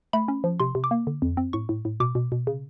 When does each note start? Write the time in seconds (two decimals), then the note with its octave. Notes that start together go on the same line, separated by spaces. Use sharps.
0.13 A3 B5
0.28 C#4
0.44 F3
0.60 C3 C6
0.75 C3
0.84 D6
0.91 A#3
1.07 D3
1.22 F2
1.37 C4
1.53 A2 C#6
1.69 A2
1.85 A2
2.00 B2 D6
2.15 B2
2.32 B2
2.47 C#3